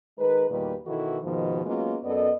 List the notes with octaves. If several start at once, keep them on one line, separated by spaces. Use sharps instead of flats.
D#3 G#3 A#4 B4
E2 A#2 D#3 G3 G4 B4
B2 D#3 E3 E4 F#4 A4
D#2 G#2 B2 D#3 F3
F#3 G#3 A#3 B3 C#4 F4
F#2 B3 A4 D5 D#5